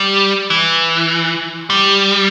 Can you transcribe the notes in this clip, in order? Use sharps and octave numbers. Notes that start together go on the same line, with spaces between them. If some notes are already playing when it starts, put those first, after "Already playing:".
Already playing: G3
E3
G3